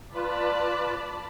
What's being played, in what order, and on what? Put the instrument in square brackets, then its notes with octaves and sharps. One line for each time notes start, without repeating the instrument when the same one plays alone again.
[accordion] F4 B4 [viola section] D5 A5 B5